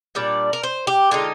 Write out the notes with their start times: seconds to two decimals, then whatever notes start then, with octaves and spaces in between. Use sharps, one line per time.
0.15 A#2 G3 D4 D5
0.53 A#4
0.63 C5
0.87 G4
1.11 D3 G#3 D#4 F4